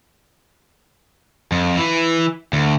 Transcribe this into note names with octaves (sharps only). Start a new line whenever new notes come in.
F2
E3
D2